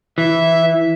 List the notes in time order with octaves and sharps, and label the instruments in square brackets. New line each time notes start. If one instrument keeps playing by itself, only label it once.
[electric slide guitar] E3 [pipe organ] E5